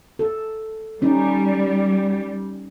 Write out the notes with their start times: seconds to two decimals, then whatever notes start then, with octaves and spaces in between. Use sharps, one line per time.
0.19 A4
1.02 G3 C#4 D#4